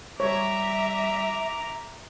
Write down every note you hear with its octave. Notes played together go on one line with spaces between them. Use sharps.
G3 C#5 E5 A#5 D6